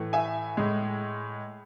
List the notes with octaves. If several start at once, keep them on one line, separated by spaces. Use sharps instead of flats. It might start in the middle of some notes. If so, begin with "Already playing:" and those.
Already playing: A2 E3 A3
E5 G#5
A2 G#3